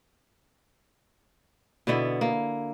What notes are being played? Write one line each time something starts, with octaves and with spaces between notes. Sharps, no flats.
B2 D3 B3 E4
A#3